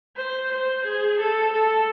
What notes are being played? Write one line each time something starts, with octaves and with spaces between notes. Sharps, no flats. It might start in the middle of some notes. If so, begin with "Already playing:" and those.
C5
C5
G#4
A4
A4